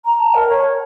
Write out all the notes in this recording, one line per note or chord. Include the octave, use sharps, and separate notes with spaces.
A#5
A5
A#4
C#5